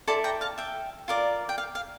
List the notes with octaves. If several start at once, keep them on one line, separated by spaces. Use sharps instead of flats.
E4 A4 D5 A5 C6
G5 A#5
F5 A5
E5 G5
F4 A#4 D5
G5
F5
F5